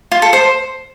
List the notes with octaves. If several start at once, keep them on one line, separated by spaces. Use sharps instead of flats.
F4
A4
C5